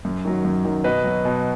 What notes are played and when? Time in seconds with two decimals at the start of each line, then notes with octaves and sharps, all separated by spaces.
0.05 F#2
0.25 D#3 F#3
0.45 F#2
0.65 D#3 F#3
0.84 B2 B4 D#5
1.04 F#3
1.25 B2